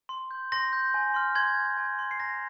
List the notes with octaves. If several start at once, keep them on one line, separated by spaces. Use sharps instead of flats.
C6
G6
C6 A#6
G6
G#5
C6 F6
C6 G#6
F6
G#5
C6 G6
C7
A#5 A#6